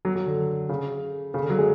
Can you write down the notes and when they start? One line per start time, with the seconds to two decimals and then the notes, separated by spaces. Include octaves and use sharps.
0.05 F#3
0.15 F#3
0.26 D3
0.69 C#3
1.34 C#3
1.42 D3
1.50 F#3
1.58 G#3